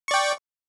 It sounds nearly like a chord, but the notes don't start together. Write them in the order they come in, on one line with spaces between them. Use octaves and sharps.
C#6 D5 G5